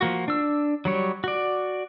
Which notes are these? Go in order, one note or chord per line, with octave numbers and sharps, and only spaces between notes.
F3 A#3 F#4
D4 E6
F#3 G3 C#5
F#4 D5